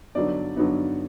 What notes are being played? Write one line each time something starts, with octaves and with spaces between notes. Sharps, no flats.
G2 D3 F#3 B3 D#4 D5
G2 D3 F#3 B3 D#4